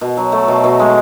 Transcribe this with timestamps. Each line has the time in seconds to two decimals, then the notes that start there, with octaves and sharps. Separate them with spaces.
0.01 B2
0.17 F#3
0.32 A3
0.48 B2
0.64 B2
0.80 G#3